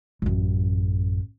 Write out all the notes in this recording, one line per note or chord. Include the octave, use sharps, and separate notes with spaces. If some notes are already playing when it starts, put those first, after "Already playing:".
A1 F#2